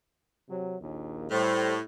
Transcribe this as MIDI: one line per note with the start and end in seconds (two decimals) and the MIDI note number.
0.49 0.75 48
0.49 0.75 54
0.81 1.28 34
0.81 1.28 39
1.31 1.79 45
1.31 1.77 55
1.31 1.77 72